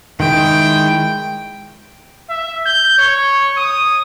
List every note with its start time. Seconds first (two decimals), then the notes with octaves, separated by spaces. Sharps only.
0.20 D#3 G#3 E4 G5
2.29 E5
2.66 G6
2.98 C#5
3.58 D#6